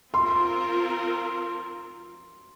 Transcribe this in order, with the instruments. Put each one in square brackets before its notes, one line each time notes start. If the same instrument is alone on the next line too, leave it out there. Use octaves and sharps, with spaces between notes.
[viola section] C4 F4 A#4 [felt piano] C6